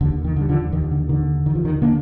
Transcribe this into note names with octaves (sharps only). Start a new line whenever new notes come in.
D#2 D3
D#3
D3
G3
D3 F3
D#2 D#3
D3
D3 D#3
D#2 D#3
F3
D#3
D3 A#3 D4